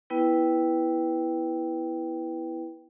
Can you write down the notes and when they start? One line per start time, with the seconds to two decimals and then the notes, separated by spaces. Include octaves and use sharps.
0.10 B3 E4 B4 G5